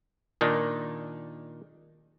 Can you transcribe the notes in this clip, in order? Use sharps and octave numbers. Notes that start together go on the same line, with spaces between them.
A#2 D#3 D4 D#4